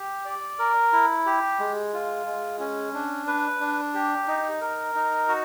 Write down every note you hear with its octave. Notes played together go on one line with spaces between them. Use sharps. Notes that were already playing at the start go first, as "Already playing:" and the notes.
Already playing: G4
D5
A#4
E4
G4
G#3
F4
G#3
C#4
D4
B4
D4
G4
D#4
A#4
D#4
F#4